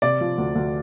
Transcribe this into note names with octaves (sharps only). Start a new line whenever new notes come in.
C3 D5
F3
D2
D2